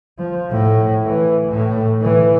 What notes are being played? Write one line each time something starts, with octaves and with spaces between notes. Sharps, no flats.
F3
A2
E3
A2
E3